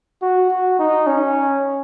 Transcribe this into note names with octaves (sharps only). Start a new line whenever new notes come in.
F#4
F#4
D#4
C#4